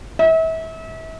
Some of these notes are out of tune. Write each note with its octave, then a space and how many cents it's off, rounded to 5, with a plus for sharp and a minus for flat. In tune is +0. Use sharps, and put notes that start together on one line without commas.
E5 -35